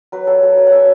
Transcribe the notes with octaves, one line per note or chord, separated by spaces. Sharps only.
F#3 B4
F#3 A4
F#3 A4
F#3 B4
F#5
C#4 E5